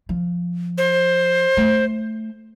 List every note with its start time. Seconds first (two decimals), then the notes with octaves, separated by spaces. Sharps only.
0.09 F3
0.78 C5
1.57 A3